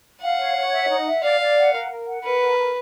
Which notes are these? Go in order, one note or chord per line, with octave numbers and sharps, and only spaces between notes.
F5 F#5
C#5
C#5
E5
D#4
E5
D5 F5
D5
F#5
A#4
A#4
F#5
A#4 B4
A#4
A#4